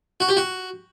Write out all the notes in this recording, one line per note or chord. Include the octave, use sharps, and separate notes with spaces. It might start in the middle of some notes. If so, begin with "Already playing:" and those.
F#4
G4
F#4